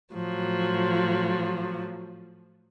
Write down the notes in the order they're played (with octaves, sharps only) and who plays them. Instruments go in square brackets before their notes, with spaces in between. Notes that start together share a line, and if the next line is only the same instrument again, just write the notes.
[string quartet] A2 F3 F#3